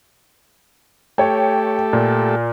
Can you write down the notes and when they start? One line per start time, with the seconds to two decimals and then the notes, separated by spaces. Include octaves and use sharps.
1.18 A3 G4 A4 C#5 G5
1.93 A#2